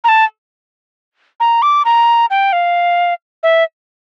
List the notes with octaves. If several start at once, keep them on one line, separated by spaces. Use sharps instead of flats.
A#5
A5
A#5
D6
A#5
G5
F5
E5